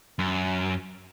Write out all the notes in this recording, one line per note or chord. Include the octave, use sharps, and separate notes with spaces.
F#2